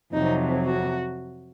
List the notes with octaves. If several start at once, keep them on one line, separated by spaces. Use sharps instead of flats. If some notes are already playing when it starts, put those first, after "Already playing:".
F2 C3 F#3 D#4
F#4